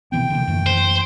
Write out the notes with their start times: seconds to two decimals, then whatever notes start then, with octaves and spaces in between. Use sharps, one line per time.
0.12 C3 E3 B3 G5
0.30 D3 A#3
0.47 F#2 E3 A3
0.66 C5